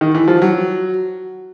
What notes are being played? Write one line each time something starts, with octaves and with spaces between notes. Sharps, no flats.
D#3
E3
F3
F#3